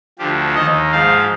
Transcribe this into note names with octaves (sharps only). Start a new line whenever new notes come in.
D2 D3 F3 G4
D#2 D#3 D#5
G#2 F3 F5